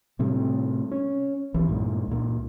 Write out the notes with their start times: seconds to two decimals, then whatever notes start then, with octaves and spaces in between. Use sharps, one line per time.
0.19 A2 C3 G3 A3
0.92 C#4
1.54 B1 E3
1.67 G2 A#2 G#3
2.08 C#2 A#2